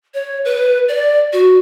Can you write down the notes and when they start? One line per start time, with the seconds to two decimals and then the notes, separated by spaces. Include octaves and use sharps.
0.14 C#5
0.45 B4
0.88 D5
1.33 F#4